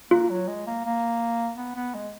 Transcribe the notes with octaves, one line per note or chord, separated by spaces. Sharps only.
A#3 F4
F#3
G#3
A#3
A#3
B3
B3
G#3